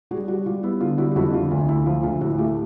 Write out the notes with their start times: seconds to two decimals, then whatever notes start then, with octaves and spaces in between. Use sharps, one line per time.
0.11 G3 F#4 G#4
0.28 G3 F#4 G#4
0.46 G3 F4
0.63 B3 E4
0.81 D3 F4
0.98 G3 E4 F#4
1.11 G4
1.16 F2 E4 F#4
1.33 D3 F4
1.51 D2 F4
1.69 D2 E4
1.86 F3 F4
2.03 D2 F4
2.21 A2 E4 F#4
2.38 A3 F4 G4